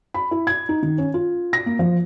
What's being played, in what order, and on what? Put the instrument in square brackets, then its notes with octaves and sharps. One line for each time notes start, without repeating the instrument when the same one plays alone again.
[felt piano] B5
E4
G#6
D#4
D#3
C#4
F4
A#6
A#3
F3